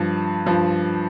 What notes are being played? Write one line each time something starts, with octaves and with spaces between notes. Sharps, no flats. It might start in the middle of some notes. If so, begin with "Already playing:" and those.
Already playing: G2 F3
G2 F3